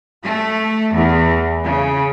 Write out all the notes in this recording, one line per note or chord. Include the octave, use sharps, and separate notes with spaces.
A3
E2
C#3